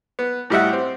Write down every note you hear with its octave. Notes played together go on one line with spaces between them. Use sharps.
B3
A2 G3 G4 D#5 E5 F#5
C4